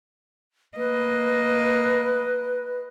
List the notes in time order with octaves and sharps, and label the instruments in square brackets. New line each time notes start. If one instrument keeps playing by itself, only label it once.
[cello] A#3 D#5 [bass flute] B4